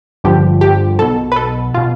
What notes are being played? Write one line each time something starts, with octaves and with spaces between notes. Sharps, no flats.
G1 G2 D3 F3 G4
G4
B1 B2 A4
B4
A4
B2 F4